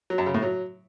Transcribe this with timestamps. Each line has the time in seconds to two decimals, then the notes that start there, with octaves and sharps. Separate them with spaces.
0.10 F#3
0.18 F#2
0.26 C#3
0.34 A2
0.42 F#3